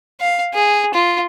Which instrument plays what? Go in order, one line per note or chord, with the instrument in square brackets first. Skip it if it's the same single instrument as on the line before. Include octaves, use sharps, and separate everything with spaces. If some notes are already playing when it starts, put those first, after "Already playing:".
[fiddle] F5
G#4
F4